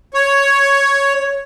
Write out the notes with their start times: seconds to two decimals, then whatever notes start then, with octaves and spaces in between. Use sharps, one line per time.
0.14 C#5